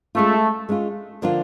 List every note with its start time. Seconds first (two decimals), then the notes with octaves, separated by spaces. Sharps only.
0.15 G#3 A3 C#4 F4
0.69 G#3 C#4 F4
1.22 D3 F3 A#3 D4 F4